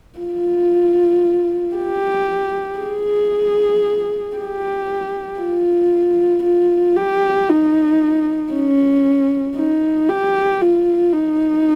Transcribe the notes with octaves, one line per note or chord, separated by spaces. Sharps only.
F4
G4
G#4
G4
F4
F4
G4
D#4
C#4
D#4
G4
F4
D#4